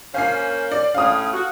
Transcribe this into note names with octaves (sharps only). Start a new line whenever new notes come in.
A#3 C#4 C5 F5 G#5 C7
D5
A2 C#4 F5 D#6
F#4